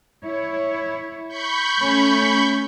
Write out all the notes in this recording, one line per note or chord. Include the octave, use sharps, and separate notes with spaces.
E4 C#5
B5 C#6 G6
A3 C#4